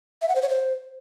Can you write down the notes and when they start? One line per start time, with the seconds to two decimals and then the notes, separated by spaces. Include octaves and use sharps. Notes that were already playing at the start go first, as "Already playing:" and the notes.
0.22 E5
0.29 F#5
0.35 C5
0.42 C#5
0.49 C5